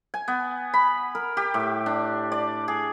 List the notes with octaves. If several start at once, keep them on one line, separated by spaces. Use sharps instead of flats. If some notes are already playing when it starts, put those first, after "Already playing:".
G#5
B3
B5
A#4
G4
A2
D4
D5
G#4